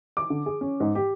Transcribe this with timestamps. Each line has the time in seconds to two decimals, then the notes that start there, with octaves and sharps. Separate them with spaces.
0.17 D6
0.30 D3
0.46 G#4
0.61 C#4
0.80 G#2
0.95 G4